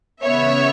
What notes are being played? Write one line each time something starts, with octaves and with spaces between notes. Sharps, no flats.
C#3 E3 B3 C#5 E5